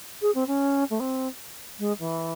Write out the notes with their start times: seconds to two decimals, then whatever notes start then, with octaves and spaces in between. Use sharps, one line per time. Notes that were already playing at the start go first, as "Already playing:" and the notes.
0.22 G#4
0.35 C4
0.47 C#4
0.90 A3
1.00 C4
1.79 G#3
1.99 E3